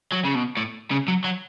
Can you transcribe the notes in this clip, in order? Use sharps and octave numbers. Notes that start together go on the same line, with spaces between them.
F#3
C#3
B2
A2
C#3
F#3
F#3